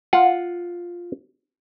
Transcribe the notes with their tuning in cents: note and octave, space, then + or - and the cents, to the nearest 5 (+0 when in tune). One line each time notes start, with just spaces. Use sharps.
F4 +0 F#5 -5